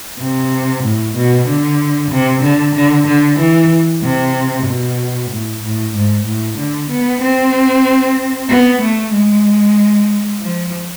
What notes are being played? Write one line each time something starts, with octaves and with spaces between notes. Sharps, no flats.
C3
A2
B2
D3
C3
D3
D3
D3
E3
C3
B2
A2
A2
G#2
A2
D3
B3
C4
B3
A3
G#3
F3